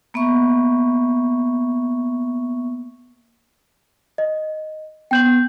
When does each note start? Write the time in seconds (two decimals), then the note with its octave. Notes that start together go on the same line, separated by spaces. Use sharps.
0.14 A#3 B3 E5 C#6
4.18 D#5
5.11 B3 G5 G6 F#7